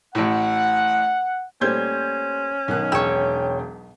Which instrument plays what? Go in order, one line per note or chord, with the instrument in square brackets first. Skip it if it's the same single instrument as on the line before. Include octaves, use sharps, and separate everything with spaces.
[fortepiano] A1 A2 [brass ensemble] F#5
[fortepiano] A#2 G3 A3 [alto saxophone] C#4 [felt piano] C5 G6 G#6
[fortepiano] B1 D#3 F#6
[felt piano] E1 G5 [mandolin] C#5 E6